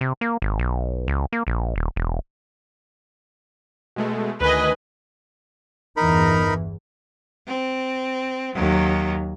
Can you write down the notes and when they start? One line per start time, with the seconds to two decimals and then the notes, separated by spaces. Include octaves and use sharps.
0.01 C3
0.21 A#3
0.42 G#1
0.59 B1
1.08 C#2
1.33 A#3
1.47 A#1
1.76 D#1
1.96 E1
3.96 B2 G#3 A3
4.41 D2 D#3 B4 D#5 G#5
5.97 G1 E2 E3 D#4 A#4 B5
7.47 C4
8.55 D#2 F#3